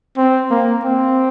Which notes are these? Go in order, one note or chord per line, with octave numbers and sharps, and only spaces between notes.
C4
A#3
C4